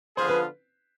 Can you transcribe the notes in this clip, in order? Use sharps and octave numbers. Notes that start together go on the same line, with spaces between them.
D3 F3 B3 F4 G#4 C5
B4